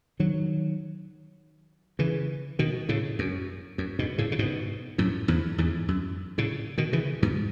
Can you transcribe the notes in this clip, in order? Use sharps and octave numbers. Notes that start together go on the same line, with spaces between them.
D#3 F#3
C#3 E3
B2 D#3
A2 C#3
F#2
F#2
G#2 B2
A2 C#3
C#3
G#2 B2
F#2 A2
E2 G#2
E2 G#2
F#2
A2 C#3
B2 D#3
C#3 E3
G#2 B2